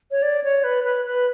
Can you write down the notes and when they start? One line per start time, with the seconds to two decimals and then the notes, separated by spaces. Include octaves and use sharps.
0.11 C#5
0.22 D5
0.44 C#5
0.64 B4
0.84 B4
1.05 B4